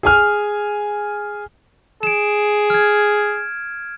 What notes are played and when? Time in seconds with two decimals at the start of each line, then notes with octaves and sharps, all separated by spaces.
0.03 G#4 G#5 F6
2.03 G#4 D7 E7
2.70 F6 G#6